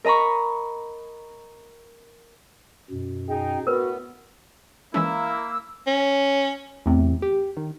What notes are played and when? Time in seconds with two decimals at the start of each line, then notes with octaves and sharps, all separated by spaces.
0.04 A#4 D#5 A#5 B5 C#6
2.91 F#2 B2
3.28 D#4 G#4 G5
3.67 A2 B3 F#4 A#4 B4
4.94 E3 G#3 A#3 C#4 E4 E6
5.87 C#4
6.86 E2 A2 C3
7.22 G4
7.57 D#3